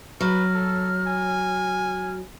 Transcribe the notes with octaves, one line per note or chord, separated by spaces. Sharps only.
F#3 B4 F6
A4
G#5